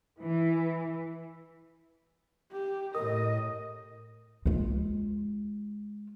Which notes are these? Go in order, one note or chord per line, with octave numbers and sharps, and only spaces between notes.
E3
G4
A2 A#4 D#5 D#6
G#3 F4